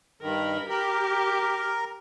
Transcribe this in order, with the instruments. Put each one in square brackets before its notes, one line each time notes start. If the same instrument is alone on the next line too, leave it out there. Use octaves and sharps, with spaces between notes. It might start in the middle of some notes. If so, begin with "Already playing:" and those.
[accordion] G2 D#3 [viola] A#4 B5
[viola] G4 [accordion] A#4